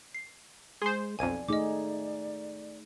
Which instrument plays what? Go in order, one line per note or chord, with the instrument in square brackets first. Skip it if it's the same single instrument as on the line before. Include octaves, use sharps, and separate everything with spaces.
[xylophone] C7
[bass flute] G#3 [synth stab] G#4 C5 [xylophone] C6
[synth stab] B1 F2 [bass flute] D5 [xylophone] G#5 G#6 D#7
[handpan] A3 D#4 G#4 [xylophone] D#5 D6